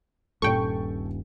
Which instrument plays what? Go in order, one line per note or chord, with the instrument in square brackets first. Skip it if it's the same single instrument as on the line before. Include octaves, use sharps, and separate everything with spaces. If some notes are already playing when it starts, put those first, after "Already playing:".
[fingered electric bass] D#1 G2 C#4 [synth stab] A#2 G5 C#6 [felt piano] A4